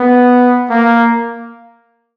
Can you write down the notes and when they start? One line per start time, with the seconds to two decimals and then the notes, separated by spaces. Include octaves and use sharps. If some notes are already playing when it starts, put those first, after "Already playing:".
Already playing: B3
0.70 A#3